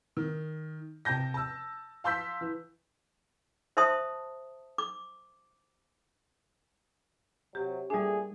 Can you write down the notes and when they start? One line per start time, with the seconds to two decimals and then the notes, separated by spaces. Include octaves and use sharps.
0.17 D#3
1.05 C3 G5 A5 G6 A#6
1.34 A5 E6
2.04 F5 A5 C6 E6 G6 B6
2.41 E3
3.77 C5 E5 A5 C6 D#6
4.78 D6
7.55 C3 F#3 G4
7.90 A#2 G3 A3 D4 G#4